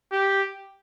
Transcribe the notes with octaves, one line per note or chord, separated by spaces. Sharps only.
G4